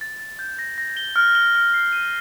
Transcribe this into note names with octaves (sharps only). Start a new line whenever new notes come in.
A6
A6
G6
A#6
A#6
G7
F6
G7
F6
C7
D#7